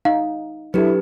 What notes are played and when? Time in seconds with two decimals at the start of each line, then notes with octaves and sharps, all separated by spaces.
0.05 D#4 F5
0.74 F#3 D4 E4 G4 A4 B4